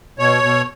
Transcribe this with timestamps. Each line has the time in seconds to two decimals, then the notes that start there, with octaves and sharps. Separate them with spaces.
0.19 B2 C#5
0.43 B2